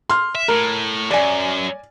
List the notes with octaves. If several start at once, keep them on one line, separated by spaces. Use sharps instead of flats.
C6 F6
E5
A2 A#4
F#2 D5 G#5